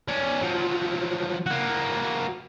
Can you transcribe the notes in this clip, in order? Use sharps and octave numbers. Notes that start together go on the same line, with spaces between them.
C#4 D5
F3 F#3
A#3 F#4